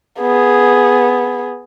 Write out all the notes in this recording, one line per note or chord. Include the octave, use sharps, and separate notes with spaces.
B3 G#4